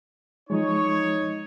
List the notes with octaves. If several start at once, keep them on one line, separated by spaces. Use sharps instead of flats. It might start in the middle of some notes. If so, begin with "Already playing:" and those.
F3 G#3 D#4 C#5